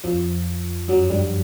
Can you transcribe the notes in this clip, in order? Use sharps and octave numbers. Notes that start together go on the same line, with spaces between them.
F2 F3
F#2 F#3
G2 G3